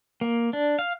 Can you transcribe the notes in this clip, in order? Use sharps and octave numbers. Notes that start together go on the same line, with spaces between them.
A#3
D4
F5